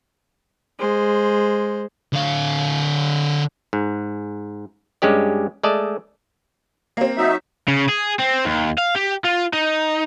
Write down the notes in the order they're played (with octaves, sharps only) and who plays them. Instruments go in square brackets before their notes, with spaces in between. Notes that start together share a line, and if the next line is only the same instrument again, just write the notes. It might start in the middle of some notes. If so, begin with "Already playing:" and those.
[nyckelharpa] G#3 C5
[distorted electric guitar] D3 F5
[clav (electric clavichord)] G#2
G2 G#3 C#4 G4 D5
G#3 A3 D5 D#5 A5
[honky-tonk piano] A#3 C4
[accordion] F#3 D#4 E5
[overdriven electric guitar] C#3
G#4
C4
D#2
F5
G4
F4
D#4